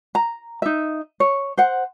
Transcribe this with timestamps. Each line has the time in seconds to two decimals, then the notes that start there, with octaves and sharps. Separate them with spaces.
0.15 A#5
0.62 D#4 E5
1.20 C#5
1.58 C5 F#5